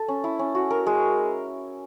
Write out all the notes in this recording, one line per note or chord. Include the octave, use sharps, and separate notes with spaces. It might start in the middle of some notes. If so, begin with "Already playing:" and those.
Already playing: A4
C#4
E4
C#4
F#4
A#4
G#3